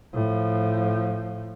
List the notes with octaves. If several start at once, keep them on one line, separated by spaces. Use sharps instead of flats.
A2 F3